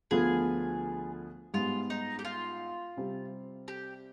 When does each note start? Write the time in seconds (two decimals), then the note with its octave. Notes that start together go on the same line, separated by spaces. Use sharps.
0.11 D2 D3 F3 B3 F4 G#4
1.54 G#2 G3 B3 F4
1.90 D#4
2.19 G4
2.25 F4
2.97 C3 G3 C4
3.68 G4